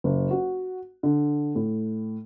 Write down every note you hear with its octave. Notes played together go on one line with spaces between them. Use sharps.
F#1
F#4
D3
A2